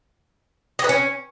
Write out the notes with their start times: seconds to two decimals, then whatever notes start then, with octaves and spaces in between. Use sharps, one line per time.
0.79 D#5
0.84 B4
0.89 C#4